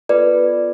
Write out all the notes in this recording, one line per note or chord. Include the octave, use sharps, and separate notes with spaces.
B3 F4 A4 B4 D5